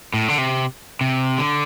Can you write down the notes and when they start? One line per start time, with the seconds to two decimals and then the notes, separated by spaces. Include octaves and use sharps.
0.14 A2
0.28 D3
0.38 C3
1.01 C3
1.38 D3